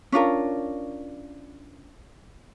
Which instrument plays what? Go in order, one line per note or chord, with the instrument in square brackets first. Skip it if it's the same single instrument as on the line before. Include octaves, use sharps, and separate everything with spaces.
[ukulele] C#4 D4 F4 A#4